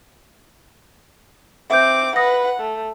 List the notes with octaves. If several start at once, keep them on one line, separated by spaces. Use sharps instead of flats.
C4 E5 D6 G6
B4 F#5 D#6 A#6
A3